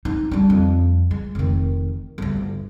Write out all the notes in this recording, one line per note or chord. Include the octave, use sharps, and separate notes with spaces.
D#4
G3 D4
F2
G#3
F1 D#3
G1 D2